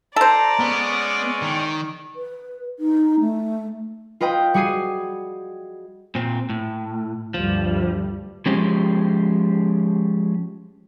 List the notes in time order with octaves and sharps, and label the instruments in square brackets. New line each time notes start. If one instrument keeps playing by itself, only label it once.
[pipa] A4 C5 [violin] D5 [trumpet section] A#5
[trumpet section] G#3 C#4 [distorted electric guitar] B3
[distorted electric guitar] D#3
[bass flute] B4
D#4
A3
[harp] F4 B4 D#5 G5
G3 F#4 G#4 C7 D#7
[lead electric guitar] A#2 C4
A2
[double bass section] D2 G2 G3 [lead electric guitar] F3
[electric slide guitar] F3 G#3 C#4 G4 C5